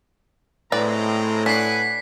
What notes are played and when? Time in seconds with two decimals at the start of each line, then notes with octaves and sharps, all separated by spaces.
0.72 A2 G#3 C4 B4 D5 A#5
1.46 D4 B4 F#5 G#5 B6 C7